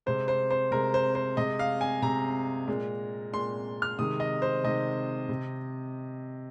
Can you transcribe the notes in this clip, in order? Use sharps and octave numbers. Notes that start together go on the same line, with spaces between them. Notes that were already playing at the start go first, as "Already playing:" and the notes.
C3 G#3 C5
C5
C5
C3 G#3 A#4
C5
C5
C3 G#3 D#5
F5
G#5
C3 G#3 A#5
A#2 G#3
A#2 G#3 C6
F6
C3 D#3 G#3 D#6
D#5
C5
C3 D#3 G#3 D#5
C3